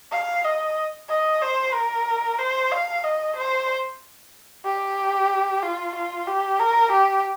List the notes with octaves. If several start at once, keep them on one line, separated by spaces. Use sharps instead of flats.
F5
D#5
D#5
C5
A#4
C5
F5
D#5
C5
G4
F4
F4
G4
A#4
G4